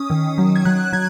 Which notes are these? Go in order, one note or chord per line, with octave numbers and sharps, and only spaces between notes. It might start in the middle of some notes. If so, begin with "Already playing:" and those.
Already playing: C#4 D#6
D#3
F#3
G#6
F#3 F#6
F#3 G#6